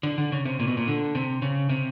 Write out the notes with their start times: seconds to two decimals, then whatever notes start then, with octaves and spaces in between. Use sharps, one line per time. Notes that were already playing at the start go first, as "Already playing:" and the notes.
0.03 D3
0.18 D3
0.32 C#3
0.45 C3
0.60 A#2
0.68 B2
0.77 A#2
0.87 D3
1.15 C3
1.42 C#3
1.69 C3